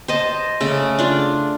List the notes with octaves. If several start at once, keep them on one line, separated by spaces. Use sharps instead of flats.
C5 D#5 A5
C#3 A3
D4 F4